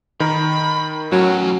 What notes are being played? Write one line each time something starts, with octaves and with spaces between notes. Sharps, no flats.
D#3 A#4 B5
A2 F#3 C#4